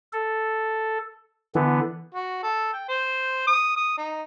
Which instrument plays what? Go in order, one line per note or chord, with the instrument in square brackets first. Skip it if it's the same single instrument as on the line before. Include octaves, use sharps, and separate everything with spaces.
[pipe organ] A4
[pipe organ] D3 B3 [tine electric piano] E3
[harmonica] F#4
A4
G5
C5
D#6
D#6
D#4